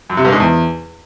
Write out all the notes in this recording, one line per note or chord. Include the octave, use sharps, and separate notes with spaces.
F#2
C3
G2
G#2
E2